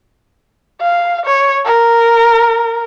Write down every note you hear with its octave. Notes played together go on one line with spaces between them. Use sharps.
F5
C#5
A#4